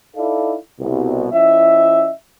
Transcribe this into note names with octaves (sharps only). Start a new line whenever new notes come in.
D#4 E4 A4 D5 F5
C2 B2
F3 C#4 E4 D#5 E5